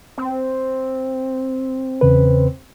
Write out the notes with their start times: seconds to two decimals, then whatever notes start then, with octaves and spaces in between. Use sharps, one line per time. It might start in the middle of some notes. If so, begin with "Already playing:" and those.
0.18 C4
2.01 E2 C#3 B4